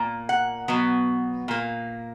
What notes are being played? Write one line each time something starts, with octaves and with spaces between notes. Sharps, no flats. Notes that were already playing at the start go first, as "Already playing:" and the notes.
Already playing: A#2 A#3
F#5
B2 F#3 B3
A#2 A#3